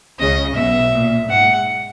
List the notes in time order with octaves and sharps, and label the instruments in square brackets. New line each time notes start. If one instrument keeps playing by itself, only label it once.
[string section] C#2 C#3 [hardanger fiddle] D#5
[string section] B1 B2 [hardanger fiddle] E5
[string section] A#2
[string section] G#2 [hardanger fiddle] F#5